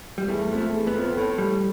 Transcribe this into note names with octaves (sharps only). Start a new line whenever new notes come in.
G3
E2 A3
F2
A3
E2
B3
F2
A2
G3